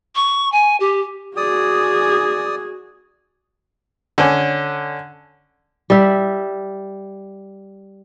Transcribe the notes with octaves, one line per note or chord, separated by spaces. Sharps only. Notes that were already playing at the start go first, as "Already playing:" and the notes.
C#6
G#5
G4
F#4 G#4 D5 D#6
D3 C#4
G3 E5